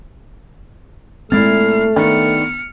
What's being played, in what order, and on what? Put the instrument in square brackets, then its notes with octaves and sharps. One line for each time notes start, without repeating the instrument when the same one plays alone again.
[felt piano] A#2 E4 A6 [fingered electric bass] G#3 C4 [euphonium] A3 [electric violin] F6 C7
[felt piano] D#3 B3 D4 [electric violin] F6 C#7